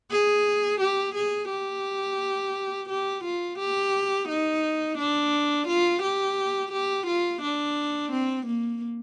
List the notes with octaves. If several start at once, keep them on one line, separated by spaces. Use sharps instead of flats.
G#4
G4
G#4
G4
G4
F4
G4
D#4
D4
F4
G4
G4
F4
D4
C4
A#3